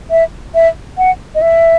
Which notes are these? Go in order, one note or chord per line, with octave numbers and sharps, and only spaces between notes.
E5
E5
F#5
D#5
E5